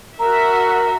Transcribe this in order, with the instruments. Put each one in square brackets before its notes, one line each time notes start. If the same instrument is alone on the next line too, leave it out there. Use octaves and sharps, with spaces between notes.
[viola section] F#4 E5 [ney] A#4 [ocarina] A#5